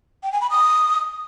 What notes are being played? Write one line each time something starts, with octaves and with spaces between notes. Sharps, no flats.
G5
G#5
B5
D#6